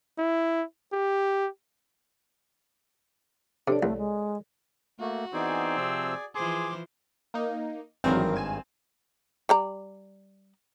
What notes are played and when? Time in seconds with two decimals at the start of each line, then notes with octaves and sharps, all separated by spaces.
0.18 E4
0.93 G4
3.68 C3 D4 A4 C#5 D5
3.83 C2 A3
3.97 G#3
5.00 A3 A#3 F#4
5.34 E3 B3 C4 D#4 G#4 D5 G#5
5.77 C3 F3 E6
6.35 E3 F3 G#4 C5 C6 D6
7.34 A#3 D#4
8.04 G#1 G2 D#3 E3 F#3 C4 A#4
8.36 G#5 E7
9.49 G3 D5 A#5